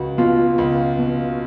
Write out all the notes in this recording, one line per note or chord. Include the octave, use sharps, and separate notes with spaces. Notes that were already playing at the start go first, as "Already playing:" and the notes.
Already playing: C#2 F#4
B2 F4
C#2
B2